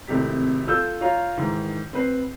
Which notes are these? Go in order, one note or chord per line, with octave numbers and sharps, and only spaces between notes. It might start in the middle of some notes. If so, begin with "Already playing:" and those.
G#1 A2 C3 G4 B6
F4 A4 E6 G6
F4 C#5 F5 A#5
G#2 D#3 E3
C4 B4 C7